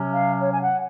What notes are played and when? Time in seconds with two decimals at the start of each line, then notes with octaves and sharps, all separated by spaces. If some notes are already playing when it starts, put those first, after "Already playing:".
Already playing: C3 F#3 C#4
0.13 F5
0.40 C#5
0.52 G#5
0.61 F#5